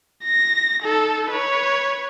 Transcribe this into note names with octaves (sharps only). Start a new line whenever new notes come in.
A#6
D#4 A4
B4 C#5